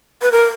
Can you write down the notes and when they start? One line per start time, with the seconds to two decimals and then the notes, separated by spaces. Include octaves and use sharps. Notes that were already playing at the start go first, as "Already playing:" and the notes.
0.22 B4
0.32 A#4